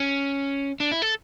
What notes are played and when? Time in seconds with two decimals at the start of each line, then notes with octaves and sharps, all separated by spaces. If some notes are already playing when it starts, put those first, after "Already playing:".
Already playing: C#4
0.80 D4
0.91 E4
1.02 A4